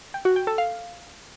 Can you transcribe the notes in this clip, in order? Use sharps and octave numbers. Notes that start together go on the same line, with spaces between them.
G5
F#4
G5
A4
F5